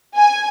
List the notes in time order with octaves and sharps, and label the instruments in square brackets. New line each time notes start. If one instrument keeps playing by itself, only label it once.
[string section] G#5